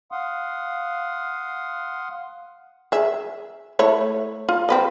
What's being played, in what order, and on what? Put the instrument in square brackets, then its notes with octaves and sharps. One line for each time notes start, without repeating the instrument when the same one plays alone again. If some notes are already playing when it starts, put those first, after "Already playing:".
[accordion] F5 F#5 C6 D#6
[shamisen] G#4 E5
A3 E4 C#5
F4
C4 B4 D#5